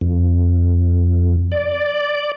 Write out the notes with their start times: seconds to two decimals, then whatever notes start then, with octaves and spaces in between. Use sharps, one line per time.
0.01 F2
1.52 D5